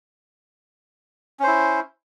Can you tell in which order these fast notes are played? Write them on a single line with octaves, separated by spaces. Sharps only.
C#4 C5 E4